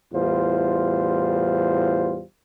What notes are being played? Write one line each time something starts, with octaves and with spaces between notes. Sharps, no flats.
E2 A2 G3 F4 C5